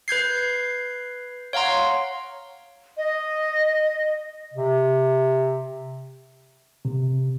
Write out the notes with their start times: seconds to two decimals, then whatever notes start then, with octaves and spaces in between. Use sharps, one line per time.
0.08 B4 G6 G#6 C7
1.53 C#5 F5 F#5 A#5 C6
2.97 D#5
4.53 C3
6.85 C3